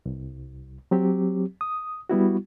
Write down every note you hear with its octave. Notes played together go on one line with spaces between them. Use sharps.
C2
F#3 C4 G4
D#6
G3 B3 E4 F#4